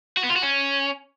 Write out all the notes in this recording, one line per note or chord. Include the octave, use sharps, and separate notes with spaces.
F#4
B3
F4
F#4
C#4